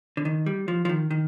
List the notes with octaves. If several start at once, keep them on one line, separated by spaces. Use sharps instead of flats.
D3
D#3
G3
F3
F3
D#3
D#3